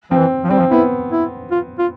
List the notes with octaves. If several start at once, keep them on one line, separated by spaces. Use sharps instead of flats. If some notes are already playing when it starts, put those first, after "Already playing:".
F3 C4
E3
F3
G3 C4
F3
B3 E4
E4
F4
F4